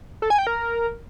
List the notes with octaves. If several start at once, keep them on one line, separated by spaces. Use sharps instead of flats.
A4
G#5
G5
A#4